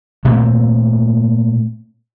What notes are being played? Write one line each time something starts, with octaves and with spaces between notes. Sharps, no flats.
A#2 A3 A#3 C4